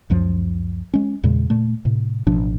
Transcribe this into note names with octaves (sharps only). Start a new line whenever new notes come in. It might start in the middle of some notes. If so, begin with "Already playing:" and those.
C#2 F#2 F3
G#3 C#4
E2 A#2 C#3 G#3
A#2 A3
A2 C3
A1 B2 F3 D4